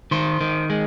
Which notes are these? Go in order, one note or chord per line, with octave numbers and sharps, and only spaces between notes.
D#3 C5
D#3
G#3